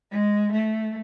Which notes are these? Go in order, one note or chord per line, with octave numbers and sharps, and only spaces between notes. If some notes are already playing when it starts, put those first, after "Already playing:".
G#3
A3